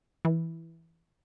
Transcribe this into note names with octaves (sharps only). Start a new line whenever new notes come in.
E3